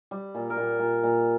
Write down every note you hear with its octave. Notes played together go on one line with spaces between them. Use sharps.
G3
A#2
A#4
A#2 G4
A#2
A#2